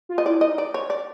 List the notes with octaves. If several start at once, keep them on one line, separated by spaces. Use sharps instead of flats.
F4
D#5
E4 D5
D#5
D#4
D5
C#5
D5